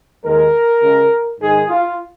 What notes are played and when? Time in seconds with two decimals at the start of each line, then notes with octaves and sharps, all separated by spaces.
0.24 D#2 D#3 G#3 A#4
0.81 C#2 C#3 G#3
1.39 G#2 D#3 G#3 G#4
1.69 F4